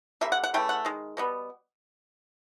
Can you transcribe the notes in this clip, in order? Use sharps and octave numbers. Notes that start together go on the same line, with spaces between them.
D3 G3 A#3 E5
F#5
F#5
C#3 E3 A3 G5
F#5
D#3 G#3
B2 G3 B3